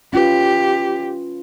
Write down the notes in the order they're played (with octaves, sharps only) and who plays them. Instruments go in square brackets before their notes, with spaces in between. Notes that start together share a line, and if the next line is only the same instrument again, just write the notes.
[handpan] C#4 F4 B4 [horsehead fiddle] G4